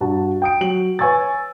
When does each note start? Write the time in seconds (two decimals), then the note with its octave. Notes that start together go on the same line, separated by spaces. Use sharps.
0.01 G2 F#4 A5
0.42 G5 D#6 D7
0.61 F#3 F#7
0.99 B4 C#5 G#5 C#6 E6 A6